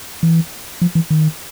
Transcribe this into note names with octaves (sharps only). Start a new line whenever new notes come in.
E3
F3
E3
D#3